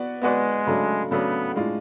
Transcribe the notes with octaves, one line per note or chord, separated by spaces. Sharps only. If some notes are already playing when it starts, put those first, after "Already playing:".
Already playing: B3 F#4 B4 D5
G#3 B3 F#4 B4 D5
C#3 F#3 A3 D4
C#3 F#3 A3 B3 D4
A2 G#3 D4 F4